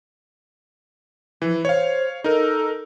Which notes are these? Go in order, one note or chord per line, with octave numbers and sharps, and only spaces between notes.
E3 F3
C5 C#5 F5
D#4 A4 A#4